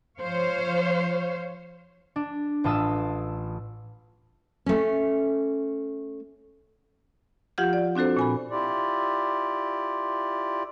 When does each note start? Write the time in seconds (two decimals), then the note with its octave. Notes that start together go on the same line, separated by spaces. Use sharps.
0.19 F3 C5 C#5 F5
2.16 D4
2.64 A1 A2 F4 A5 D#6 E6
4.66 A3 C#4
7.58 F3 F4 G4 F#5 F6 G6
7.73 D5
7.95 C4 D4 F#4 A4 C5
8.17 A#2 G#5 B5
8.51 E4 F4 G4 D5